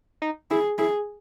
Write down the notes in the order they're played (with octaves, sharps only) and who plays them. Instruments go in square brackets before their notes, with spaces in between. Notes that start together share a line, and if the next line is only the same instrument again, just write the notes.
[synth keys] D#4
[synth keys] E4 [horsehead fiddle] G#4
[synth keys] E4 [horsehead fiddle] G#4